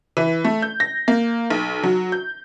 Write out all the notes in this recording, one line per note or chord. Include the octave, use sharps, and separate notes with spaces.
E3
A3
G6
A#6
A#3
B1
F#3
G6